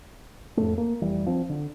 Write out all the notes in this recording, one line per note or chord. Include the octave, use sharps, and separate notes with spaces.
F2 A2 A3
A#3
F1 E3 G3
F3 C4
D3